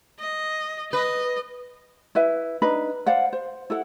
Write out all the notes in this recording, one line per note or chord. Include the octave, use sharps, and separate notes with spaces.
D#5
B4 D#5
E4 B4 E5
D4 D#4 B4 B5
C5 D5 F5 F#5
C5
E4 A4 F#5